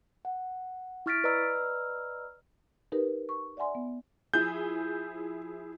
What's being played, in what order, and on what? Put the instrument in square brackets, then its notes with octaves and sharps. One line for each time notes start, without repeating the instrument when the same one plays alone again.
[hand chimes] F#5
E4 C#6 F6 A6 B6 D7
B4 D5 D#5 A#5 E6 F6
[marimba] D#4 G4 A#4 B4
C#6
D5 E5 F#5 G#5 C6
B3
[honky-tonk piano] F3 E4 G#4 [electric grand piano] G6